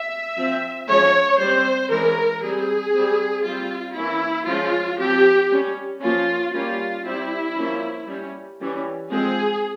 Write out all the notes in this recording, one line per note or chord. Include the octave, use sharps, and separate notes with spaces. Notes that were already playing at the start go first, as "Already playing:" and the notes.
Already playing: E5
F3 C4
F3 G#3 C#4 C#5
G3 C4 C5
E3 G#3 C#4 A#4
G3 C4 G#4
G3 C4
G3 C4 F4
E3 A#3 C#4 E4
F3 G#3 C#4 F4
F3 C4 G4
G3 C#4
F3 A#3 C#4 F4
G3 A#3 C#4 F4
G3 C4 E4
F3 A#3 C#4
G3 C#4
E3 G3 C#4
F3 G#3 C4 G#4